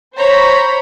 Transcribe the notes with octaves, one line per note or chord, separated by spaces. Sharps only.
C5 C#5 A#5 B5